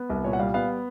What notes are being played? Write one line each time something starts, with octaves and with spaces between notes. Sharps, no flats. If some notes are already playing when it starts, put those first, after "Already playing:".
Already playing: B3
C2
A#2 C#5
F#5
G3 F5
B3 F5